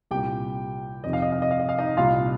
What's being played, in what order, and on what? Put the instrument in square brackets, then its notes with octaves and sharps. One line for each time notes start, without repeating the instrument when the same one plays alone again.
[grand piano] C2 A#2 G4 G5
F2 C3 D#3 D#5
F5
D#5
F5
D#5
F5
D#5
F5
D#4 D#5
C2 A#2 F4 F5